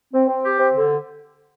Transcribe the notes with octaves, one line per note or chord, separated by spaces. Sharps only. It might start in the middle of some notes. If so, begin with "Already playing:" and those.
C4
C4
G4
C4
D3